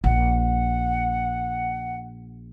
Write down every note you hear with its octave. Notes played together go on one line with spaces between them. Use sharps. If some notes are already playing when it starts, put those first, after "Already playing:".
A#1 F#5